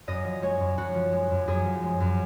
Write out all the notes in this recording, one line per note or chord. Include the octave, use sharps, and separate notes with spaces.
F#2 D#5
F3
G#3 C#5
F#2
F#2 F#4
F3
G#3
F#2
F#2 G#4
F3
G#3
F#2